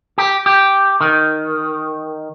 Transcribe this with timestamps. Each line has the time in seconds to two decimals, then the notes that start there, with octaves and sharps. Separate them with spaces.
0.18 G4
0.46 G4
1.01 D#3